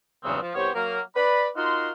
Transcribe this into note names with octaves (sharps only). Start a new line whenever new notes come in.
E2 G2 C#3 F#3 B3 C4
F3
C2 B3 G4 C5 C#5
F#3 A#3 A#4
B4 D5 B5
D#4 F4 F#4 A#4 C6